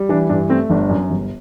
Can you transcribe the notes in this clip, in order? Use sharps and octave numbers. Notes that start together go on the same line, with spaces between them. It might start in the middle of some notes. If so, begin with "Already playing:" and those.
Already playing: G3
E3 D4
G2 D4
A3 C4
G1 D4
F#2
G1